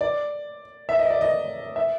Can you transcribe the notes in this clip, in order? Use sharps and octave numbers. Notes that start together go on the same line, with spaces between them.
D5
E5
D#5
D5
D#5
E5